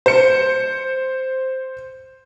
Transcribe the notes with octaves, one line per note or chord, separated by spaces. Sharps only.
C5 C#7